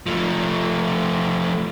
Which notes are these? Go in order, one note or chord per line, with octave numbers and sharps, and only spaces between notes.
F3 A3